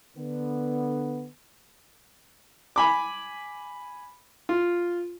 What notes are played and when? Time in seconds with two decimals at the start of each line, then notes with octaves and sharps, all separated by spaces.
0.17 D3 B3
2.76 G#5 B5 D6
4.49 F4